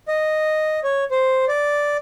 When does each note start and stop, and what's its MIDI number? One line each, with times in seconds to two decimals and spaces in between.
0.08 0.80 75
0.84 1.04 73
1.11 1.45 72
1.48 1.97 74